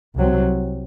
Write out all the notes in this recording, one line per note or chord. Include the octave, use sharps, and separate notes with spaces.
C2 C3 F#3 C4